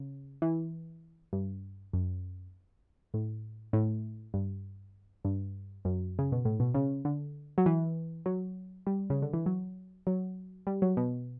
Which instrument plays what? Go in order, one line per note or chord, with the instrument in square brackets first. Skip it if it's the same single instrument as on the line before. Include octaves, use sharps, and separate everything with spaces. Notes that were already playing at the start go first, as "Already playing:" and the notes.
Already playing: [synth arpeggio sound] C#3
E3
G2
F#2
A2
A2
G2
G2
F#2
C#3
B2
A2
B2
C#3
D3
F#3
E3
F#3
G3
C#3
D3
E3
F#3
F#3
G3
F#3
B2